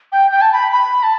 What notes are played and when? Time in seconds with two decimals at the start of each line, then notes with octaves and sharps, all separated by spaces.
0.12 G5
0.31 G5
0.42 A5
0.53 B5
0.72 B5
1.03 A5